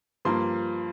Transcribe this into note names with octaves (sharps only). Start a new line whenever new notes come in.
G2 F3 A#3 C6